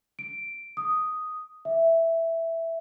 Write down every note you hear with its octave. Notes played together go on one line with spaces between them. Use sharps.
D7
D#6
E5